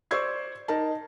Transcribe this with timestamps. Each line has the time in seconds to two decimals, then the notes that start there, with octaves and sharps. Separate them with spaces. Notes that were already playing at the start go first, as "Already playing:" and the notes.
0.11 C5 D5 C#6 E6 G#6 C7
0.68 D#4 A#4 A5